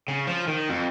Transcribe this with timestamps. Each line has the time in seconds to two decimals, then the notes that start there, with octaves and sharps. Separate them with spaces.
0.08 C#3
0.28 F3
0.48 D#3
0.69 F2